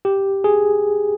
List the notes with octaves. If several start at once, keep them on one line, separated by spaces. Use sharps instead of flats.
G4
G#4